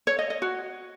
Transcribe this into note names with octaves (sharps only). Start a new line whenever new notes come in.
C#5
D#5
D#5
F#4